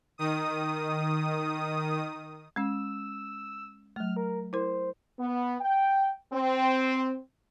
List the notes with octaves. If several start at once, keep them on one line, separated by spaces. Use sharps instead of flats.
D#3 D#6
G#3 C#4 E6
F#3 A3 F6
A#4
E4 A#4 C5
B3
G5
C4